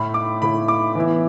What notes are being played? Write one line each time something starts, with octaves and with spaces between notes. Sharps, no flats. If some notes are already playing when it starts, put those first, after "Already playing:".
Already playing: A2 A3 E4 B5
D6
A2 A3 E4 B5
D6
E3 B3 E4